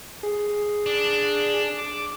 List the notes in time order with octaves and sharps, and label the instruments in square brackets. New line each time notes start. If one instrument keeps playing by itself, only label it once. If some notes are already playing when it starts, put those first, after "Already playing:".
[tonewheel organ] G#4
[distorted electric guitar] D4
[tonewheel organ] D6